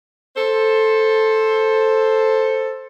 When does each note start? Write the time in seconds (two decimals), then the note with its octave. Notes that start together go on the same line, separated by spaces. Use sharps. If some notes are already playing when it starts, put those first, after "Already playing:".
0.37 A4 C5